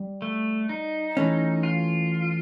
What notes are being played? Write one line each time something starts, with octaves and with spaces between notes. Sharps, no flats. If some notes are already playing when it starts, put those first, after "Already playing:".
Already playing: G3
A3
D#4
E3 A3 C#4
F4